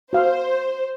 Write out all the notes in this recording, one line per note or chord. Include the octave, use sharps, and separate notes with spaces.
F#4 C5 F5